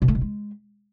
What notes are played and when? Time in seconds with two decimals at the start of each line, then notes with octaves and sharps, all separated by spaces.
0.02 B2
0.08 A3
0.15 B2
0.21 G#3